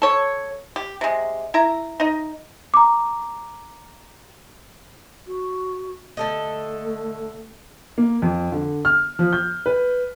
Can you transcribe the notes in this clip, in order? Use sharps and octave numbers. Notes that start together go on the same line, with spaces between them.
A4 C#5
G4
C3 G#3
E4 A#5
D#4 D#5
A#5 D6
F#4
D3 A3 A4 D#5
A#3
F2
D3
F6
F3
G6
B4